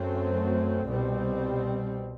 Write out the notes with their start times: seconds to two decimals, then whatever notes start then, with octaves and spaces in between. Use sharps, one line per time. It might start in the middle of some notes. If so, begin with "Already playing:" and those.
Already playing: F#2 F#3 A3 C4
0.86 C2 B2 G3 C4